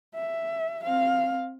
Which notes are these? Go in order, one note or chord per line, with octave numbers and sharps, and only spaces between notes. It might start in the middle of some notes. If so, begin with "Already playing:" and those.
E5
C4 F5